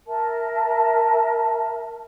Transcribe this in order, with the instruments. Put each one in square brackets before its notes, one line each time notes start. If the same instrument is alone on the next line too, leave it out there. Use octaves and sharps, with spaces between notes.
[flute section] A#4 E5 A5